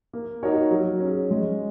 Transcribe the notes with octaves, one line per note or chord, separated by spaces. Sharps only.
A#3
D#4 F#4 A#4 C#5
F#3
C#4 G#4
G#3